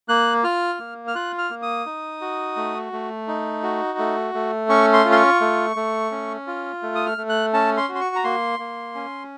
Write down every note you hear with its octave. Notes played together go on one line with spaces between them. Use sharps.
A#3 F#6
F4 F6
A#3
F6
F4 F#6
F6
A#3
D#6
D#4
F#4
A3
A3
D#4
F#4
A3
A3
C#4 C#6
C6
F4
C6
C#6
A3
A3
C#4
F4
A3
D#6
F6
A3
F#6
C#4 A5
C6
F#4
C6
C#6
A#5
A#3 C6
A#3
C#4